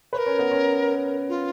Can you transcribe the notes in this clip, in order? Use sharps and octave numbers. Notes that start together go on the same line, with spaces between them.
A#4 B4 C#5
C#4
B3
C#4
F4